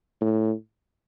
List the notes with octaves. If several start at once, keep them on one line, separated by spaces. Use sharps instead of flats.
A2